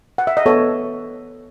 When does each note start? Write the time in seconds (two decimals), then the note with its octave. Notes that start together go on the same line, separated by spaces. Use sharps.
0.18 F#5
0.27 E5
0.37 D#5
0.46 B3 A4 C#5